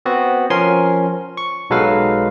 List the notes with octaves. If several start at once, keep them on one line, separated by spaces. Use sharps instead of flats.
B3 C4 F#4
F3 C#4 A#4 G#5 C6
C#6
B1 F#3 G#3 A4 B4 F5